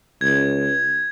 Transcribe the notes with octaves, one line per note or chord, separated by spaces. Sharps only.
C#2 G#6